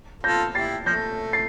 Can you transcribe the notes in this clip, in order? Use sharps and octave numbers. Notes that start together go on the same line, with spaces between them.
F4 A4 G6 A#6
E4 G4 A6 C7
F3 A3 G6 A#6
A6 C7